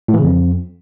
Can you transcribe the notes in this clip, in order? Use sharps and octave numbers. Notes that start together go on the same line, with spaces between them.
A2
E3
C#3
F2